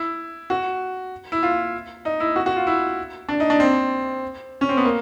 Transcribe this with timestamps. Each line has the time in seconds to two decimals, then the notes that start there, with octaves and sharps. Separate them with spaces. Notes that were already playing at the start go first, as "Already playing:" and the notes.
Already playing: E4
0.50 F#4
1.32 E4
1.43 F4
2.05 D#4
2.20 E4
2.36 F#4
2.46 F#4
2.56 F4
2.67 E4
3.29 D4
3.40 D#4
3.50 D4
3.60 C4
4.61 C#4
4.69 C4
4.77 B3
4.85 A#3